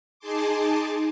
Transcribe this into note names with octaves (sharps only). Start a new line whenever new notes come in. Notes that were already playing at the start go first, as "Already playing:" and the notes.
D#4 G#4 G#5 A5 C6 D6